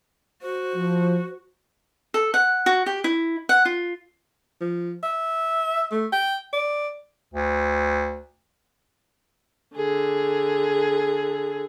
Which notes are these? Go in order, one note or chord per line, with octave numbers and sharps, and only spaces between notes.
F#4 C5
F3
A4
F#5
F#4
G4
E4
F#5
F4
F3
E5
A3
G5
D5
D2
D3 G#4